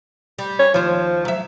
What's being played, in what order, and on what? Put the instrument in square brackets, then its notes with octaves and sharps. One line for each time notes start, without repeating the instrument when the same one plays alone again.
[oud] G3
[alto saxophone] C#5
[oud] D#2 C5 [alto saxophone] F3
[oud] F#3 E5